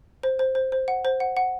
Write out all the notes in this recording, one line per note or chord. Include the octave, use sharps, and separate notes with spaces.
C5
C5
C5
C5
F#5
C5
F#5
F#5